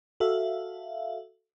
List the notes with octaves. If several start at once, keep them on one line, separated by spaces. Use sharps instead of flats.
F#4 A4 E5 F5